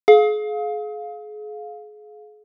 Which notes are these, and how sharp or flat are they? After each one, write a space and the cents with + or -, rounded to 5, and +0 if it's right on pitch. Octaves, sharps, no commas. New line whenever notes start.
G#4 +35 F5 +15